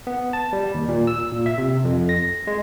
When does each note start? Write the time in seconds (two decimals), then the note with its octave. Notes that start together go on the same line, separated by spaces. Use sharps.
0.07 B3
0.33 A5
0.53 G3
0.74 D#2
0.88 A#2
1.07 E6
1.32 A#2
1.46 E5
1.58 C3
1.85 F2
2.09 A#6
2.47 G#3